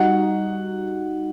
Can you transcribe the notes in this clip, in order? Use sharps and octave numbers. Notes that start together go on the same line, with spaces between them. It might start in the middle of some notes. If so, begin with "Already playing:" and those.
Already playing: G3 D#4 F#4 F#5